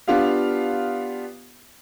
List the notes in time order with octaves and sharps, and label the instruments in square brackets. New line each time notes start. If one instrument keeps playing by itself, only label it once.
[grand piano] B3 D4 F4 G4 F5